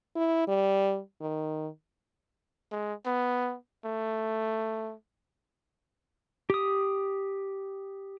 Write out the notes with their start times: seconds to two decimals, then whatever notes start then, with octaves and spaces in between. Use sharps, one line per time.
0.15 E4
0.48 G3
1.21 D#3
2.72 G#3
3.06 B3
3.85 A3
6.50 G4 D#6